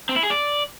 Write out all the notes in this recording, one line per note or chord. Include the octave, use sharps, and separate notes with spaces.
C4
E4
G#4
D5